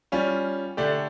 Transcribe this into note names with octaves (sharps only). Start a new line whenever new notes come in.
G3 C#4 F4
D3 A3 D4 G4